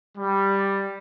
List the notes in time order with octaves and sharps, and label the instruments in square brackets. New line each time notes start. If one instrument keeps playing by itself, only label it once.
[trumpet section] G3